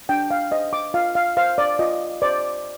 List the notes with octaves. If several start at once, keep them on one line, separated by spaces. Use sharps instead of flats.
D4 G5
F5
C5 D#5
D6
F4 F5
F5
C5 F5
D5
F4 D#5
C5 D5